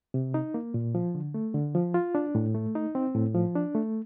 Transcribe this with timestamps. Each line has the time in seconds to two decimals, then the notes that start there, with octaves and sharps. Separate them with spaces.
0.14 C3
0.34 D#4
0.54 A#3
0.74 A#2
0.95 F3
1.15 D3
1.34 A3
1.54 D3
1.75 F3
1.94 F4
2.15 D4
2.35 A2
2.55 A3
2.75 D#4
2.95 C4
3.15 A2
3.35 F3
3.55 D4
3.75 A3